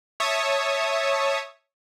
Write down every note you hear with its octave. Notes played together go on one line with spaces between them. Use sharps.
C#5 E5 A5 C#6 D#6